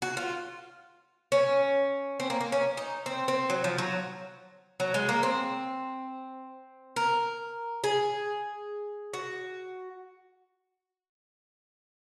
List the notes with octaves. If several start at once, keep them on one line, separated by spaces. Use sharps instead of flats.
F#4
F4
C#4
C4
A#3
A#3
C#4
D#4
C4
C4
F#3
F3
F#3
F#3
G#3
A#3
C4
A#4
G#4
F#4